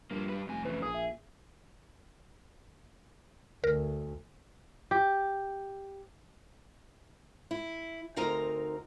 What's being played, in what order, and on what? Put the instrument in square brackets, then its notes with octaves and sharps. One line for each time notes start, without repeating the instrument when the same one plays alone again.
[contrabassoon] G2 [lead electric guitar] F3 A#3
[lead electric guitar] G3 B4
[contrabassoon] F1 [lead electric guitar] G2 G#5
[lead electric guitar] C#3 E3 [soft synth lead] B4
[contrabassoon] A#1 [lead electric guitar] G#4 [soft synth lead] D#6
[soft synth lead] E5
[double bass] D2 [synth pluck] A#4
[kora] G4
[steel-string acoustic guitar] E4
D2 C4 D#4 A#4 A#5